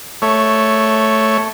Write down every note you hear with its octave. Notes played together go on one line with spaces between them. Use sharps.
A3 C#5